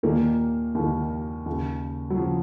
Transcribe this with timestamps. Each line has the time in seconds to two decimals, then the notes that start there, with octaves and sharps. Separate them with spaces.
0.03 D#2 A#2 D#3 A#3
0.75 D#2 D#3
1.46 D#2 C#3
2.10 F#3
2.18 C#3 F3